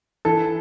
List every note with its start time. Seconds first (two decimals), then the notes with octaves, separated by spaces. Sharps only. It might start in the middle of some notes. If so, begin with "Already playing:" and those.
0.25 E3 A4